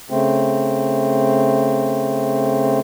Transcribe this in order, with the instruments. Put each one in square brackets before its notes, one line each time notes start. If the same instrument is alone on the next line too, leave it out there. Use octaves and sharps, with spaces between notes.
[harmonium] C#3 A3 C4